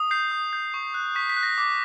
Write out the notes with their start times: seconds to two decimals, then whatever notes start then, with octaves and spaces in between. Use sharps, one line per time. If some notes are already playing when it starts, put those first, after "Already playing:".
Already playing: D#6
0.11 G6 C7
0.31 D#6
0.53 G6
0.74 C#6
0.94 F#6
1.15 C#6 B6
1.29 B6
1.37 F#6
1.43 A#6
1.58 D6